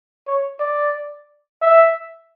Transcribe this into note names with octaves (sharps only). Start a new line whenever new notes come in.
C#5
D5
E5